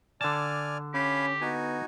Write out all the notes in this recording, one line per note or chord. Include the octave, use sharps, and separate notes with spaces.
D3 D5 G#5 A5 F6
C#4 G4 F5 G#5 B5
B3 D#4 F#4 G#5